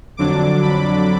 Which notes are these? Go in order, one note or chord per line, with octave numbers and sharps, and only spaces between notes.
F2 D3 F#3 D4 D6
B5